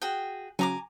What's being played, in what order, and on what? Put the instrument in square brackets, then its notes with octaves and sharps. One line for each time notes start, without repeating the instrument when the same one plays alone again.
[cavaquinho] F#4 G#4 G5
[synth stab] C#3 F#3 [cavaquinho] G#5 A#5 D6